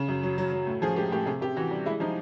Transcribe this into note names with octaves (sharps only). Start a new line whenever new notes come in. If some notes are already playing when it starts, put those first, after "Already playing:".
Already playing: C#3
F#2
F#3
F#3
F#3
A2
F3 G#4
G#3 G4
A2 G4
C3 G#4
C3 G4
E3 F#4
G3
G#3 E4
F3 D#4